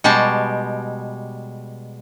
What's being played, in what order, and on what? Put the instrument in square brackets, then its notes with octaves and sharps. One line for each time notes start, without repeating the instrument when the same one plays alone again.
[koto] B2 G3 G#3 G4 A5